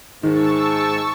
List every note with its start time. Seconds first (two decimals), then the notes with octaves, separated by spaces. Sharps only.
0.23 G#2 D#3 A5 C#6 E6